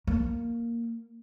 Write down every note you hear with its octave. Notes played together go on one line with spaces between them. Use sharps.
A#3